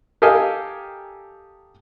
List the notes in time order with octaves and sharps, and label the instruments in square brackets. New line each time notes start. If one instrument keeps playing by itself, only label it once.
[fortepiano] G4 A4 A#4 D#5 F5 G#5